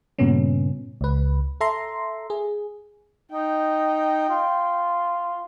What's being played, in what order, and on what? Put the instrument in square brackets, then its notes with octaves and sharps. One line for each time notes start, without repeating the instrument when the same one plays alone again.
[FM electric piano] G2 A#2 C#3 B3 C#4
C#2 B4
A4 E5 A#5 C6
G#4
[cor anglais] D#4 [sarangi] G5
[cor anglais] F4